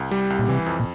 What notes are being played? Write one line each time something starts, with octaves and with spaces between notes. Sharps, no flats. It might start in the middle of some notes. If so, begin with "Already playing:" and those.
Already playing: C2
G3
C2
A#2
C3 E3
F2
A#2